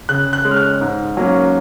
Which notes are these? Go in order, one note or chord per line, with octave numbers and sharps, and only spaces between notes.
C#3 F#6
F#6
G#3 C#4
F6
F#6
G#2
F#3 A#3 C#4